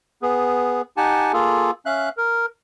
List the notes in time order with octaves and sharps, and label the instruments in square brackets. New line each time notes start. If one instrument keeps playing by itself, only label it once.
[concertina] B3 G#4
D#4 G4 F#5 G#5 A5
A#3 F4 G#4 A4
C#4 E5 F5 F#6
A#4